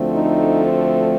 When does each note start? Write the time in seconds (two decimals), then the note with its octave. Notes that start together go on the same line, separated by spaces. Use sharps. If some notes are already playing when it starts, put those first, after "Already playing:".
Already playing: D2 D3 F3 A3 C4
0.11 D#4